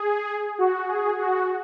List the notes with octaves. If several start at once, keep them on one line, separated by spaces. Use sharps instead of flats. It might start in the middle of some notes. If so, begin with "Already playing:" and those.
Already playing: G#4
F#4
G#4
F#4